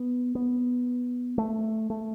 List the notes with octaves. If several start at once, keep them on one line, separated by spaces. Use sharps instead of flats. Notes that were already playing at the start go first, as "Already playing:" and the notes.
Already playing: B3
B3
A3
A3